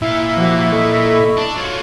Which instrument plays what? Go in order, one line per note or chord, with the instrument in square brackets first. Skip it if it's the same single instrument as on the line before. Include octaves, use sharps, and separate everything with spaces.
[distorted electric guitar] A#2 F5 [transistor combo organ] E4
[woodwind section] C3 A#3 F#4 [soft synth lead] F3
[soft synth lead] A4 [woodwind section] D#5 B5 C#6
[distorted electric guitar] D4
[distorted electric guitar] F4 F#4 [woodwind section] C#5